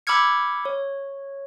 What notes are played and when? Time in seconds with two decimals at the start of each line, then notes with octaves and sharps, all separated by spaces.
0.07 B5 D6 E6 F6 G#6 C#7
0.65 C#5